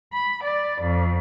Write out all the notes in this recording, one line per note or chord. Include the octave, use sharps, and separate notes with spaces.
B5
D5
F2